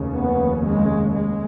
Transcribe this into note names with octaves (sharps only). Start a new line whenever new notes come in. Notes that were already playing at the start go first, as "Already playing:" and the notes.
Already playing: F1 D#2 C#3
B3
G#3
G#3